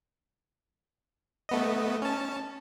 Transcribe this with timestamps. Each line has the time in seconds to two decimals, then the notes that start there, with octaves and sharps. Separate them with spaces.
1.49 A3 B3 D#5
2.02 C#4 A5